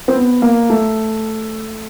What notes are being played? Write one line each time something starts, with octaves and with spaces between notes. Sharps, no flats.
C4
B3
A#3
A3